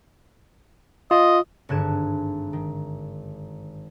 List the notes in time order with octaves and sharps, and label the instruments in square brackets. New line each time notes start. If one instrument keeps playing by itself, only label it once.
[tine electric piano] F4 [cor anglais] D#5
[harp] G#1 G2 D3 F#6 G#6 E7
D#3